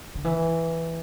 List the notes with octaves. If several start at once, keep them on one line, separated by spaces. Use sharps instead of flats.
D3
E3